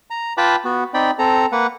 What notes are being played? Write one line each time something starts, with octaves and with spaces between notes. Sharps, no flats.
A#5
F4 B4 G5 A5 B5 D6
B3 F#4
C4 D#4 D5 G5 B5
C4 A4 A#5
A#3 B4 F#5